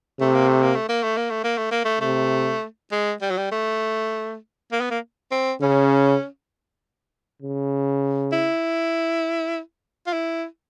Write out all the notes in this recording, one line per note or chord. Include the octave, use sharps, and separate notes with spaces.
C3 A3
A#3
A3
A#3
A3
A#3
A3
A#3
A3
A#3
A3
A#3
A3
C3 A3
G#3
G3
F#3
G3
A3
A#3
B3
A#3
C4
C#3 C#4
C#3
E4
F4
E4